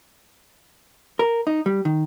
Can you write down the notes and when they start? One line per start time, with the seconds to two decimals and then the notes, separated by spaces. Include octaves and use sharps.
1.19 A#4
1.47 D#4
1.66 G3
1.85 D#3